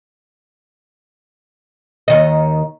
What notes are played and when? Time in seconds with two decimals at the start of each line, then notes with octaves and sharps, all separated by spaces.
2.08 D#2 D#3 D#5